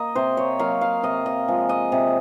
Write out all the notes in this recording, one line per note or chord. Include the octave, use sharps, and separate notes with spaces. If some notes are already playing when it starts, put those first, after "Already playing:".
Already playing: A#3 D#5
C3 C5
C#5
F#3 A#3 F5
F5
C3 D#5
D#5
F3 G#3
D#5
C3